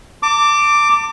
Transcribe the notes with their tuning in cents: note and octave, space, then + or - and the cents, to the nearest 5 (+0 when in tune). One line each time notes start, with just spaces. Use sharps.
A5 +40 D6 +0